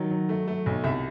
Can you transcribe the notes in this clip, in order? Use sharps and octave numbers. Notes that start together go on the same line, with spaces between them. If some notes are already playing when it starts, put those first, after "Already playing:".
Already playing: D#3 F#3
F#3
A3
A3
B1
C2 E5